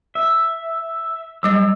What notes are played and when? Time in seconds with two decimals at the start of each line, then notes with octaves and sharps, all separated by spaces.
0.15 E5
1.43 F#3 G3 D#5 E6